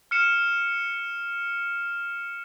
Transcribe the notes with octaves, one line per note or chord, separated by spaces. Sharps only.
F6 C#7 E7